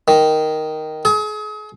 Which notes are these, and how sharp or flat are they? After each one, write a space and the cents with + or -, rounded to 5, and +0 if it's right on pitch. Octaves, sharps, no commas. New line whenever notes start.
D#3 +0
G#4 +35